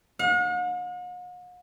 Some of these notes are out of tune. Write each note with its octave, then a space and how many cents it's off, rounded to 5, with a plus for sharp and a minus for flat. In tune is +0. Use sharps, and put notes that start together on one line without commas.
F#5 -45